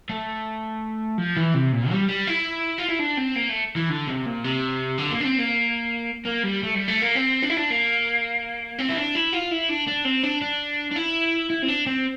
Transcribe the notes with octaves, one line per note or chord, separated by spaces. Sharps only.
A3
F3
E3
C3
A#2
G3
G3
E4
F4
E4
D4
C4
A#3
A3
E3
D3
C3
A#2
C3
D3
A#3
D4
C4
A#3
A#3
G3
A3
G3
A3
A#3
C4
D4
E4
D4
A#3
C4
E4
D4
E4
F4
E4
D4
D4
C4
D4
D4
D4
E4
E4
C4
D4
C4